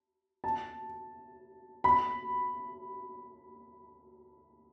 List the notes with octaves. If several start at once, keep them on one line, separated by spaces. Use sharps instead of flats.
A5
B5